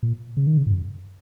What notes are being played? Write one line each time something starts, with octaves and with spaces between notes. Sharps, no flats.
A#2
C#3
D#3
C#3
G#2
F#2